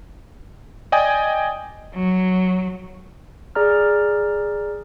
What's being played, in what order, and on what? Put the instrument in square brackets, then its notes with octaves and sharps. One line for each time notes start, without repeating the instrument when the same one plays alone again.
[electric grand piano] D5 D#5 G5 G#5 D#6
[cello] F#3
[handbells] G#4 D5 A#5 F6